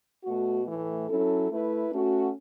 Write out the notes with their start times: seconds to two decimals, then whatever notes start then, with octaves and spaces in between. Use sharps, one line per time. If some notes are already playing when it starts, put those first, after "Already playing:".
0.23 B2 A3 F#4
0.64 A2 E3 A3
1.07 F#3 C#4 E4 A4
1.48 A3 E4 B4
1.90 A3 C#4 F#4 A4